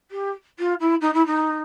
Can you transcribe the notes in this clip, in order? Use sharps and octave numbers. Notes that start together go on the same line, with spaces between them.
G4
F4
E4
D#4
E4
D#4